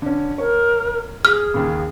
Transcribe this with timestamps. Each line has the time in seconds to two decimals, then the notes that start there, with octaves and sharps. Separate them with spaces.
0.02 D3 C#4
0.38 A#4 C#5
1.25 G#4 F6
1.54 D#2 C#3